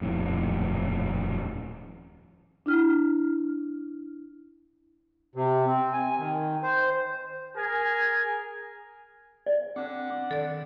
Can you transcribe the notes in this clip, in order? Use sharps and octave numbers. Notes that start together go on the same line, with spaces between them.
D#1 F2 A2
D4 E4 F6
C3
C4
G#5
D#3
C5
G#4 A#4 G#5
D5
D3 C4 D4 F#5 D6
D#3 A4 D5